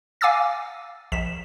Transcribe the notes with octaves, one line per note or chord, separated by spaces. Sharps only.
F5 G#5 D6 E6 A6
A#1 B6 E7